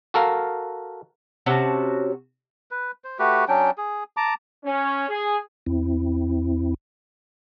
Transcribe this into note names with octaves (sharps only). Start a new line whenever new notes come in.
F#4 A4 A#4 F5
C3 C#4 F#4 A5
B4
C5
A3 F#4 G4 B4
F#3 C#4 D4 G5
G#4
A5 A#5 D6
C#4
G#4
E2 C4 E4